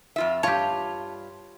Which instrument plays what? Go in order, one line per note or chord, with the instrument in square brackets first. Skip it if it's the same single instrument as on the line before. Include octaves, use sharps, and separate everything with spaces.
[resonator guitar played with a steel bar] F2 F4 E5
[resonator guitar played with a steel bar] G2 F4 [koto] G4 C#5 [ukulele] A5